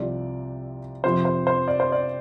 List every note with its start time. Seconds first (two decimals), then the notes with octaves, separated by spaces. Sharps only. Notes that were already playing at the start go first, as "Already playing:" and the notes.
Already playing: C2 C3 F3 D5
1.04 F2 C3 F3 C5
1.25 C5
1.47 C5
1.68 D5
1.80 C5
1.92 D5